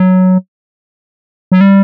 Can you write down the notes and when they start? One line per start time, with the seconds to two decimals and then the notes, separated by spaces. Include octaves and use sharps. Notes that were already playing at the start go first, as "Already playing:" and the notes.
Already playing: F#3
1.52 F#3
1.61 G3